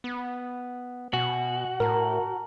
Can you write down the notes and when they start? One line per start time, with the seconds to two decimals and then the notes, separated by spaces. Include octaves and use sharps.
0.04 B3
1.13 B2 F#4 G#5
1.80 A2 A#4 A5 A#5 F6